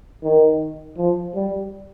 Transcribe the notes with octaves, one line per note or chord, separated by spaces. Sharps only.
D#3
F3
G3